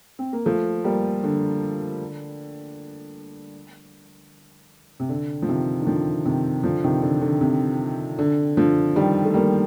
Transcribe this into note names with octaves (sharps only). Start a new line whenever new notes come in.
C4
A#3
F3 A3
G3 A#3
D3
C3
D3
F3
C3 D#3
D#3
D3 F3
C3 D#3
D3 F3
C3 D#3
D3
D3
C3
D3
D3 F3
D#3 G3
A3
G3 A#3